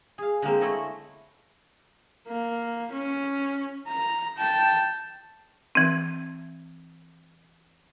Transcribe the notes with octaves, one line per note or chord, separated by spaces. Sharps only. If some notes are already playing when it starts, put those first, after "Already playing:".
G#4 F5
D3 G#3 A#3 C4
A3 E4 C#5 D#5
A#3
C#4
A#5
G5 A5
E3 C4